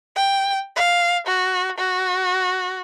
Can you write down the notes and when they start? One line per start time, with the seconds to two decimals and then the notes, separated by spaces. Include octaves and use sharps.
0.16 G5
0.76 F5
1.28 F#4
1.78 F#4